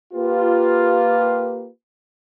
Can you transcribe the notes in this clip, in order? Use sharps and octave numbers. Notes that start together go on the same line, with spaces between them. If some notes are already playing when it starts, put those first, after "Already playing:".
A#3 F4 G4 B4